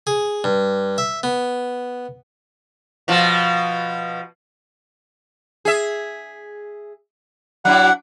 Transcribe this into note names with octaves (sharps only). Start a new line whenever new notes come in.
G#4
G2
E5
B3
B2 F3
G#4 E5
F#3 D4 E4 F#5